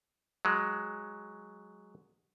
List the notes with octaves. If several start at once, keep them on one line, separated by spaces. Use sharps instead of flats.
F#3 G#3